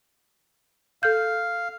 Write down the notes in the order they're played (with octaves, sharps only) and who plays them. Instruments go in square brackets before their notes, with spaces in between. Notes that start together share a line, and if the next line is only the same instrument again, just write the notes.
[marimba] A4 G6 [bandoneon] F5